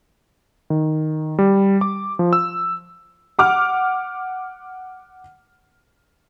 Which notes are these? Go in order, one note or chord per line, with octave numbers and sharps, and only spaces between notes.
D#3
G3
D6
F3
E6
F#5 D6 F6